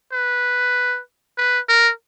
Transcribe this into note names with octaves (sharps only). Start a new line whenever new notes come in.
B4
B4
A#4